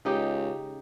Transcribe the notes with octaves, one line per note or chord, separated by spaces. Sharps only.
C#2 C#3 D#4 G4